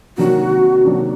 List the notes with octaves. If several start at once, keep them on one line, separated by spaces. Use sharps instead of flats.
C3 D#3 F#3 A#3 D4 F#4
C3 D#3 F#3 A#3 D4